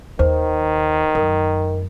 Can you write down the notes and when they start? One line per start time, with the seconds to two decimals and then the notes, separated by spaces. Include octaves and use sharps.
0.19 D#2 D#3 C5
1.15 F#2 A#4